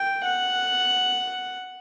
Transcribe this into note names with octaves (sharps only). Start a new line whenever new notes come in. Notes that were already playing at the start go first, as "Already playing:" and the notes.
Already playing: G5
F#5